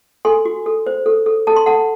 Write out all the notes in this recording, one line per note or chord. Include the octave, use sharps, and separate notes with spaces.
A4 G#5 C6
F#4
A4
C5
A4
A4
A4 A5
C6
A4 F#5 A5